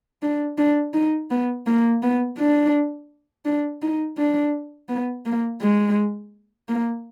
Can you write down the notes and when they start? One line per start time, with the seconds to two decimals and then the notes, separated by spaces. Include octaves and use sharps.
0.22 D4
0.58 D4
0.94 D#4
1.30 B3
1.67 A#3
2.03 B3
2.38 D4
3.45 D4
3.82 D#4
4.18 D4
4.89 B3
5.26 A#3
5.61 G#3
6.69 A#3